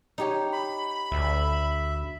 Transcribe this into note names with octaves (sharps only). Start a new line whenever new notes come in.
D#4 G4 C#5
B5
D2 E5